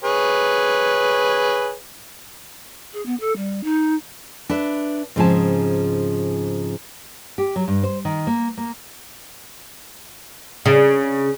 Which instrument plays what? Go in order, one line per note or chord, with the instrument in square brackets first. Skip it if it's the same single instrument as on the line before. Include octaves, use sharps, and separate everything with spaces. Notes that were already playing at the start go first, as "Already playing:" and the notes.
[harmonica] G#4 B4 C#5
[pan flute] G#4
B3
A4
G3
D#4
[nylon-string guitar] D4 B4 E5
G#2 C#3 F3 C4 G#4 A5
G4
F#3
G2
C5
D#3
A#3
A#3
[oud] C#3